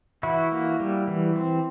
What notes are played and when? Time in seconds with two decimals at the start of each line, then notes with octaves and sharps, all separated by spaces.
0.23 E3 E4 F#4
0.52 A#3
0.80 G3
1.08 E3
1.36 C4